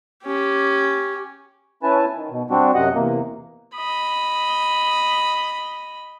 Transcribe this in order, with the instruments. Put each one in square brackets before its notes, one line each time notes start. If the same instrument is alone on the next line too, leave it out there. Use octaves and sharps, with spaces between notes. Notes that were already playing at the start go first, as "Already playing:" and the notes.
[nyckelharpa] C#4 G4
[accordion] C#4 E4 B4 G#5 A5
D#3
B2
G3 C4 D4 F#4
F#2 C3 F#4 D#5 F#5
E2 C3 A#3
[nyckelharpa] D#5 B5